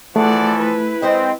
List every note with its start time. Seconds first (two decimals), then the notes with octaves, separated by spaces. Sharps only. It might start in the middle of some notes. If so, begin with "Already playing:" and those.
0.16 E3 F3 A3 G#4 A4 D5 F#5
0.58 E4 B4
1.02 G#3 C4 C5 D#5